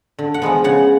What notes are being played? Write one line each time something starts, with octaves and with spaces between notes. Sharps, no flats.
D3
F#5
F3 G#3 B3
C#3 F#5